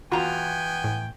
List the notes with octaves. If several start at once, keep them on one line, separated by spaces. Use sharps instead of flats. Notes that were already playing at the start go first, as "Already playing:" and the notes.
E2 B3 F4 F#4 G5 G#5 A#5
A2